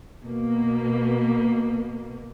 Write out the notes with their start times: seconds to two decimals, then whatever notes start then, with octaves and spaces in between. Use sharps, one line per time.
0.22 B2 A#3